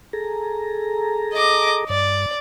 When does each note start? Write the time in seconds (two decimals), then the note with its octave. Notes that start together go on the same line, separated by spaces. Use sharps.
0.13 G#4 A4 A#5
1.34 D#5 D6
1.90 G2 D5